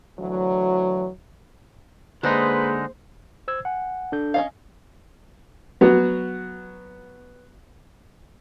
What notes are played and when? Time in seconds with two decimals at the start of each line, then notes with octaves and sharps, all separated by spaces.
0.19 D2 E3 F#3
2.23 D3 G#3 A#3 D#4 G#4 B4 C5
3.48 C5 E6 G#6
3.65 F#5 G#5
4.12 D4 A4 G6
4.34 C#4 D#5 F5
5.81 F#3 B3 F#4